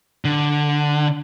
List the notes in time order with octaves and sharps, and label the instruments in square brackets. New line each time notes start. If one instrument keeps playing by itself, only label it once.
[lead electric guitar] D3